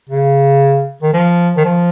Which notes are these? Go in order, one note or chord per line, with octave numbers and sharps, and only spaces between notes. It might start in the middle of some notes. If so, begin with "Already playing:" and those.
C#3
D#3
F3
D#3
F3